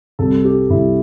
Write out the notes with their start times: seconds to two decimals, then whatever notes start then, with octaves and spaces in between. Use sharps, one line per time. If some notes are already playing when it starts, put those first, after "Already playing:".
0.19 C2 C3 G3 A4
0.45 G4
0.70 C2 C3 G3 E4